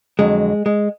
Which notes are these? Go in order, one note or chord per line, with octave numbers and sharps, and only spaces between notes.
F2 D3 F#3 G#3
G#3